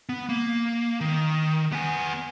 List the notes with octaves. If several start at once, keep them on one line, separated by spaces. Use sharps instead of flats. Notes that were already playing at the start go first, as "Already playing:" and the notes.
B3
A#3
D#3
B3 G#5